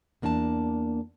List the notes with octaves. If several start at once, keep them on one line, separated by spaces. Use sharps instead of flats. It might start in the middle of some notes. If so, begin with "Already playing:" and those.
E2 A#3 D4 G#5 A5